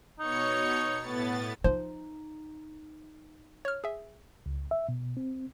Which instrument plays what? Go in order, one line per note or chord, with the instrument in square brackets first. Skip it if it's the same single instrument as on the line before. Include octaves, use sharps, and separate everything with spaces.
[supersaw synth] B2 C#5 C#7 [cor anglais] D#4
[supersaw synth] A2 B3 A6
[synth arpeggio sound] F3 C5 [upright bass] D#4
[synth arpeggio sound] C#5 F6
G#4 E5
[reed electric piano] C#2
E5
B2
C4